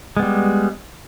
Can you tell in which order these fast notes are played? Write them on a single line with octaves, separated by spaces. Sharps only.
G#3 B3 G3